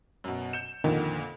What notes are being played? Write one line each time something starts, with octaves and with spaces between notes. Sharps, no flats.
F#2 B2
G6 C#7 E7
F2 A#2 D3 D#3